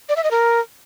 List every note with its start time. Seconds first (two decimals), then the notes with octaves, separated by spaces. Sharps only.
0.09 D5
0.16 E5
0.24 D#5
0.31 A#4